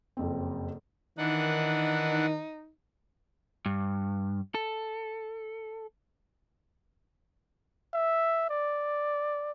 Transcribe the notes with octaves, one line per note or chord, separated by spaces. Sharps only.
F#1 F2 C4
D#3 E3 D4 D#4 F#5
G2
A4
E5
D5